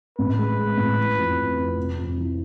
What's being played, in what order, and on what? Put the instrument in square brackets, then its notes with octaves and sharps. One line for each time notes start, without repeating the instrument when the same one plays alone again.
[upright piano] A1 [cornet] B4
[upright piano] G#3
G#3
A2
E3
F2
F2
F2
F1
F2
E3